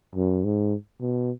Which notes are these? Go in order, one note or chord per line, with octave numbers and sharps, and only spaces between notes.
F#2
G#2
B2